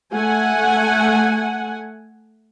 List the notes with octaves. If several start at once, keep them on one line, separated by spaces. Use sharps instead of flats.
A3 F#5 G#5